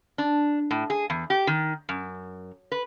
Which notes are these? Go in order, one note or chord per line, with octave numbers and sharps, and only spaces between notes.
D4
A2
G#4
E2
G4
D#3
F#2
B4